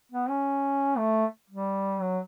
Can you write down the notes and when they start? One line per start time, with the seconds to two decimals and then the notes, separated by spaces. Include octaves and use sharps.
0.12 B3
0.29 C#4
0.98 A3
1.50 G3
2.01 F#3